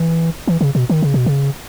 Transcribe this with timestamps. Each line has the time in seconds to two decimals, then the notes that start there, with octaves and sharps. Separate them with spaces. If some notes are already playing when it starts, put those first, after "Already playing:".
Already playing: E3
0.47 E3
0.61 C#3
0.75 B2
0.90 D#3
1.02 C#3
1.14 B2
1.26 C#3